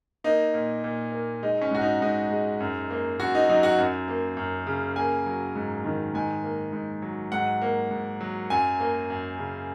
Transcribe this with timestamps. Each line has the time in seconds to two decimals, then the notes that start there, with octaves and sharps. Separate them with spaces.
0.24 A#3 D#4
0.54 A#2
0.84 A#2
1.12 A#3
1.43 G#3 D#4
1.61 C#4
1.71 G#2 F#4
1.81 D#4
2.01 G#2 D#4
2.31 G#3
2.60 F#2
2.90 A#3
3.19 F#2 F#4
3.35 D#4
3.49 F#3 D#4
3.63 F#4
3.78 F#2
4.08 A#3
4.37 F#2
4.67 C#3
4.96 A#3 G#5
5.26 F#3
5.55 G#2
5.84 D#3
6.14 G#2 G#5
6.44 A#3
6.73 G#2
7.02 F#3
7.32 G#2 F#5
7.61 A#3
7.91 G#2
8.21 F#3
8.50 F#2 G#5
8.80 A#3
9.10 F#2
9.39 C#3